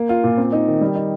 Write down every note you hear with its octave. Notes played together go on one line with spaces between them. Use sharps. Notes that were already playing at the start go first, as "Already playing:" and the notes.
Already playing: A#3
F4
A#2
C4
D#4
D#3
G3
D#4